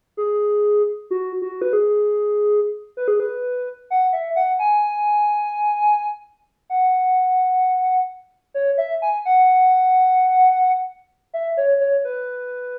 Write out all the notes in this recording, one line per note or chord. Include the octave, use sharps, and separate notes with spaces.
G#4
F#4
F#4
B4
G#4
B4
G#4
B4
F#5
E5
F#5
G#5
F#5
C#5
E5
G#5
F#5
E5
C#5
C#5
B4